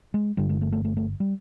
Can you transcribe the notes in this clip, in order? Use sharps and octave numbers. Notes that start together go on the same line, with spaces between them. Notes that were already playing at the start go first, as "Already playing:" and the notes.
G#3
G1 G2 D3 G3
G#3
A3
A3
A3
A3
G3